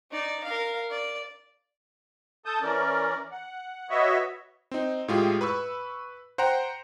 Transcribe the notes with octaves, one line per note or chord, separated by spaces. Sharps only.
D#4 D5
A#4 F5
D5
A4 A5 D#6 G6
E3 C#4 A#4 D5
F#5
F#4 B4 C#5 D#5 E5
C4 D#4
A2 G#3 F4 G4 G#4
B4 B5 C#6 E6
C5 F#5 G5 A#5